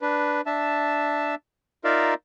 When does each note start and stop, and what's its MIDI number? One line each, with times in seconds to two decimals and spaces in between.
0.01 0.41 62
0.01 0.41 71
0.46 1.35 62
0.46 1.35 76
0.46 1.35 81
1.84 2.14 63
1.84 2.14 65
1.84 2.14 70
1.84 2.14 74
1.84 2.14 76
1.84 2.14 77